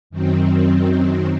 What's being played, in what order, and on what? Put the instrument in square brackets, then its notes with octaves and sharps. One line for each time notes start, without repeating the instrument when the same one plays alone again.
[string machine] F#2 D#3 F#3 C4